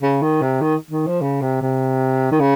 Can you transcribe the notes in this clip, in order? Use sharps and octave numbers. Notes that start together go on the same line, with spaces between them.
C#3
D#3
C3
D#3
D#3
F3
C#3
C3
C3
D#3
C#3